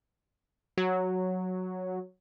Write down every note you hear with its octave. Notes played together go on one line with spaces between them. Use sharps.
F#3